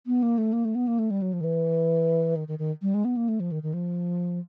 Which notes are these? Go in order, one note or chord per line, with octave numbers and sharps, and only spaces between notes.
B3
A#3
A3
A#3
A3
B3
A#3
A3
G3
F#3
F3
D#3
E3
D#3
D#3
D#3
G3
G#3
B3
A#3
A3
F3
D#3
D#3
F3